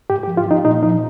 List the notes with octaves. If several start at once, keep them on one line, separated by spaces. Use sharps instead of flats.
G#2 G4
G4
F3
F4
F3 D#4
A#2 D#4
F3 D#4